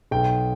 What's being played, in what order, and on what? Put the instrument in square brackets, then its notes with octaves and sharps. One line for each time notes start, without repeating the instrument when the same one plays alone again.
[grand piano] B1 G5